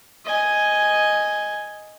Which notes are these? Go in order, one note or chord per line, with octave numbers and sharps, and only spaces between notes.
D#5 G#5